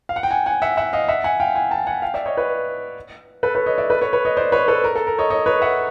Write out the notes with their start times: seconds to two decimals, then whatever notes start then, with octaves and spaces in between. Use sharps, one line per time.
0.09 F5
0.16 F#5
0.23 G5
0.31 F#5 G#5
0.46 F#5 G#5
0.62 E5 F#5
0.77 E5 F#5
0.93 D#5 F5
1.08 E5 F#5
1.24 F#5 G#5
1.40 F5 G5
1.55 F#5 G#5
1.71 G5 A5
1.87 F#5 G#5
2.02 F5 G5
2.14 D5 E5
2.26 C#5 D#5
2.37 B4 C#5
3.43 A4 B4
3.55 B4 C#5
3.66 C#5 D#5
3.78 D5 E5
3.90 A4 B4
4.01 B4 C#5
4.13 B4 C#5
4.25 C#5 D#5
4.37 C5 D5
4.52 B4 C#5
4.68 A4 B4
4.84 A#4
4.96 A4
5.07 A#4
5.18 C#5 D#5
5.30 C#5 D#5
5.46 B4 C#5
5.62 E5 F#5